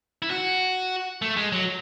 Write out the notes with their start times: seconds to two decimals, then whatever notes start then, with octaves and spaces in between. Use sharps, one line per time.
0.22 E4
0.30 F#4
1.22 A3
1.37 G#3
1.52 F#3